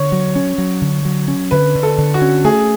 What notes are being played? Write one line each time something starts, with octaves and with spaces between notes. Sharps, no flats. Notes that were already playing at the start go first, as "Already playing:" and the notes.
Already playing: D3 C#5
F#3
C#4
F#3
D3
F#3
C#4
D3 B4
D3
A4
D3
F#4
C#4
A3 G#4